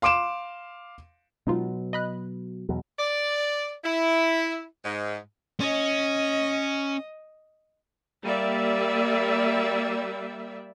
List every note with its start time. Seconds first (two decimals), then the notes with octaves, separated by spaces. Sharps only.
0.02 F5 C6 D6 D7 E7
1.47 B2 F#3 G#3 D#4 F4
1.93 D#5 B5 F#6
2.69 E2 B2 F#3
2.99 D5
3.84 E4
4.85 G#2
5.60 C#4 D#5
8.23 G3 A#3 D5 E5